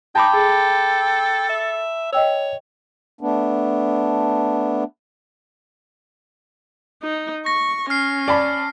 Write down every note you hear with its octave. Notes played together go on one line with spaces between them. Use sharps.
D#4 G5 A5 B5 D6
G#4 A4
E5
C#5 D#5 G5 E6
A3 B3 D4
D#4
C#6 A#6
C#4 F6 C7
D5 A5 B5